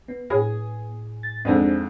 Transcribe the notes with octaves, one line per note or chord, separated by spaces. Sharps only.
B3
A2 G#4
A6
F2 G#2 D4 G#4 A4